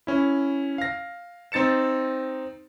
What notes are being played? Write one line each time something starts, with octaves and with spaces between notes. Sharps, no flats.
C#4 E4
F5 A#6
C4 D#4 A6 C#7 E7